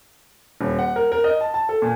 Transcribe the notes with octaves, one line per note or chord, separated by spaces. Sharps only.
D#1
F#5
A#4
A#4
D#5
A5
A5
A4
A#2